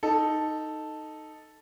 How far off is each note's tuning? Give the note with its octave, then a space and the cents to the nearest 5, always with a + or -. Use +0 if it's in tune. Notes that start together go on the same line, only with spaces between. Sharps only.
D#4 +0 A4 +0